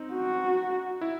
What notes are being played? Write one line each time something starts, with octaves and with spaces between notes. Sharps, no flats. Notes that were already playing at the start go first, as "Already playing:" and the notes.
Already playing: C4 D#4
F#4
E4